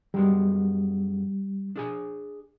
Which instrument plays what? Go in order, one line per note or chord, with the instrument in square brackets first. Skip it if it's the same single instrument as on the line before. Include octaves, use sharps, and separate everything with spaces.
[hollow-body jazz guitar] F#2 G#3 B3 [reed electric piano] G3
[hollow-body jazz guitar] D4 G#4 G#5